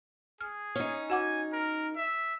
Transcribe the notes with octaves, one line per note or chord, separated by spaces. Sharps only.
G#4 F6
C#4 D#4
F#4 F#5 G#5 D6
A#4
E5